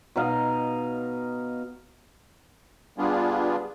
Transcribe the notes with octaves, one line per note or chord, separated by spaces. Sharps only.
B2 D#4 D#5 F5
G3 B3 D4 F4 G#4